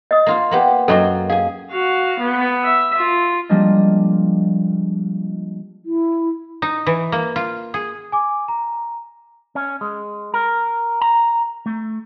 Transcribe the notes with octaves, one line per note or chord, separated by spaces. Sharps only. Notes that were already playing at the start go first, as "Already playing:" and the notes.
D#5 D#6
A#3 F4 F5
A#3 B3 G4
F#2 F#3 A#3 A4 D#5 C#6
G#4 F5 G#5
F#4 F5
B3
E5
F4
F3 G3 G#3 A#3 D4 D#5
E4
D#4
E3
A#3
F4
G#4
G#5 D6
A#5
C#4
G#3
A#4
A#5
A3